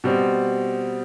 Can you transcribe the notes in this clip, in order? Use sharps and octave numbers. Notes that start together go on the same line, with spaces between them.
B2 G3 C4